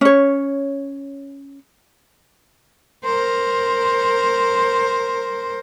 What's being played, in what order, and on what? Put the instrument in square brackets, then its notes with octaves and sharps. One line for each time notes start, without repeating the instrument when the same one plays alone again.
[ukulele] C#4 C#5
[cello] A#4 C5